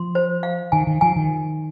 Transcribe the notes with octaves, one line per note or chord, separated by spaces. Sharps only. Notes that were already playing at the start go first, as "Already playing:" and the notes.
Already playing: F3 C6
C5
F5
D#3 G#5
D#3
F3 G#5
D#3